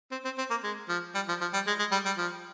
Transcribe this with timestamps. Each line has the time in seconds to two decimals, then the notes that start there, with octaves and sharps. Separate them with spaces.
0.12 C4
0.25 C4
0.38 C4
0.50 A#3
0.64 G#3
0.89 F3
1.15 G3
1.28 F3
1.41 F3
1.53 G3
1.67 G#3
1.79 G#3
1.92 G3
2.06 G3
2.18 F3